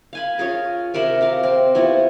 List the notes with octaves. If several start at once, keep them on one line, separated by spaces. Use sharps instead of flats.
F5 G#5 B5
C#4 F4 G#4 A#4
C3 A#4 E5 B5
F#4 A#4 F5
C4
F3 B3 E4 F#4